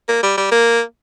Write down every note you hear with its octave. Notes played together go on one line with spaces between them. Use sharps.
A#3
G3
G3
A#3